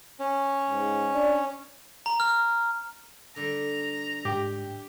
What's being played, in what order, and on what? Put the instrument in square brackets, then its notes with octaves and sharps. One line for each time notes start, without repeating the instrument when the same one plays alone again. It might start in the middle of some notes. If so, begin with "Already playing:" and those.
[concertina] C#4
[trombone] G#2
D4
[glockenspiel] A#5
F6
[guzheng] D3 G3 [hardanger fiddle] A#5
[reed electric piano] G#2 G5 [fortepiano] G4